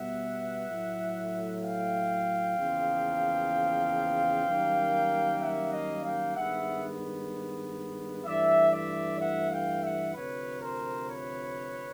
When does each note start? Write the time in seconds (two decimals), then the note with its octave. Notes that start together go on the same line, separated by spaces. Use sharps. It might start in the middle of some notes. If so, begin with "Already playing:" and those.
Already playing: B2 G3 B3 E5 F#5
0.68 A2 F#3 A3
1.62 F5 G5
2.57 E2 C#3 F3 A#3
4.47 F#2 D#3 G3 A#3
5.41 E5 F#5
5.73 D#5 F5
6.04 F5 G5
6.35 G2 D#3 G#3 B3 E5 F#5
8.25 G2 E3 A3 D5 E5
8.73 D5 E5
9.19 E5 F#5
9.52 F5 G5
9.83 E5 F#5
10.14 D2 C3 F3 B4 C#5
10.61 A#4 C5
11.09 B4 C#5